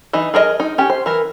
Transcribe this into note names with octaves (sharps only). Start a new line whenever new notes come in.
E3 D#4
G#4 A#4 B4 D#5
D#4
C#4 G4
C5
E3 A#4